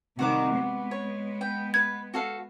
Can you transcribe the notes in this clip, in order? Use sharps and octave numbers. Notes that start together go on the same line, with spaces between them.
C3 D#3 G3 F#4 F#5 D6
G#3 B3
C#5
G5
B4 G#6
F#4 A4 F5